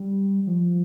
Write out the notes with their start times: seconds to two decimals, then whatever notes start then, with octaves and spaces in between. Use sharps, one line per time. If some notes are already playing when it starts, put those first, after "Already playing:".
Already playing: G3
0.47 F3